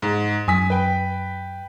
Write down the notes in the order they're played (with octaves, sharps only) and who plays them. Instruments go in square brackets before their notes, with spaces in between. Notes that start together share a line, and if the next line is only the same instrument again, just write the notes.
[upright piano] G#2
[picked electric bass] F#2 [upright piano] G#5 D#6 B6
[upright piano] B4 G5